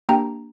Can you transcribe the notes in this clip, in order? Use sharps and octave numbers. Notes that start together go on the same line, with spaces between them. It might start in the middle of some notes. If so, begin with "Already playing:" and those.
A#3 D4 G4 G5 A#5